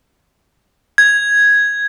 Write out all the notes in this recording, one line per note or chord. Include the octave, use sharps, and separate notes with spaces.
G#6